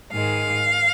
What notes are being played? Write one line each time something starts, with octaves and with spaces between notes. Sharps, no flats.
G#2 D#3 G#3 F5